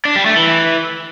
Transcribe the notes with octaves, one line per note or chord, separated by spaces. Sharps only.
D4
G3
A3
E3